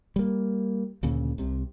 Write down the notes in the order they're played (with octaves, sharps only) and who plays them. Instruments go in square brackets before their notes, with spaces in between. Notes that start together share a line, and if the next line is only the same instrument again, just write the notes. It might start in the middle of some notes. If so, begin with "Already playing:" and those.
[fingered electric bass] G3 A#3
D2 A#2 C#3
C2 C3